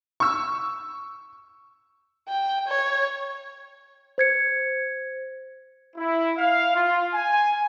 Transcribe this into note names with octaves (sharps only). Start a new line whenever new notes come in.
C#6 E6
G5
C#5
C5 G#6 C#7
E4
F5
F4
G#5